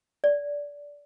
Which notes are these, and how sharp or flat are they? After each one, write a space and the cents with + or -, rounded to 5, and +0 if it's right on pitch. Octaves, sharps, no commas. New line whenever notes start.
D5 -20